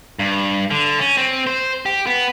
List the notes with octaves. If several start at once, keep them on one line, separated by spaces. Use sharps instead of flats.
G2
D3
C#4
C4
C5
G4
B3